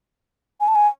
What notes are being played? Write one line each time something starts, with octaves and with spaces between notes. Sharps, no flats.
G#5
A5
G#5